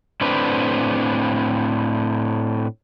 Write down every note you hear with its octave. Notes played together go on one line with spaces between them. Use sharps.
A2 C4 D4 B4